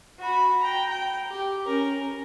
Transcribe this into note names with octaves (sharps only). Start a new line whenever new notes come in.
F#4 B5
G5 A#5
G5
G4
C#4 A#4